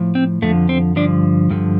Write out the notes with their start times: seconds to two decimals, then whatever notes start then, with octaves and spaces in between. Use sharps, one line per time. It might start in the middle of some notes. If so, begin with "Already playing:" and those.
Already playing: A2 F3
0.15 C4
0.42 F2 D3 F3 A3
0.69 C4
0.96 G2 D3 F3 D4
1.50 G2 D3 F3